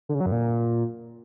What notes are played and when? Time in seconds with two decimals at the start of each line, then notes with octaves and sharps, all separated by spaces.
0.09 D3
0.15 C#3
0.20 F#3
0.26 F#2
0.32 A#2